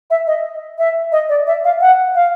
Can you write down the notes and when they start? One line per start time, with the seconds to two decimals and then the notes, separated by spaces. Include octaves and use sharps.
0.10 E5
0.27 D#5
0.78 E5
1.12 D#5
1.29 D5
1.47 E5
1.64 F5
1.81 F#5
2.15 F5